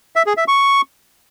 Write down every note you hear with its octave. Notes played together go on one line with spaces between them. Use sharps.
E5
G#4
E5
C#6